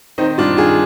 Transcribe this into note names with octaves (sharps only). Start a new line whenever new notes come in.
D#3 C4 D#4
G2 D4 F4
D#3 F4 G#4